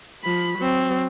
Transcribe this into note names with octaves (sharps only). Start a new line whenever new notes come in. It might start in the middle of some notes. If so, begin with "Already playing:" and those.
F3 B5
F#3 C4